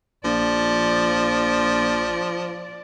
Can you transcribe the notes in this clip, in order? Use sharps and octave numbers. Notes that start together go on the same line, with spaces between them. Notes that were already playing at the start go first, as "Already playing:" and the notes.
A#1 F3 D5